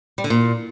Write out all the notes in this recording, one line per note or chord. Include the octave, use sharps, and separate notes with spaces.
G3
D3
A#2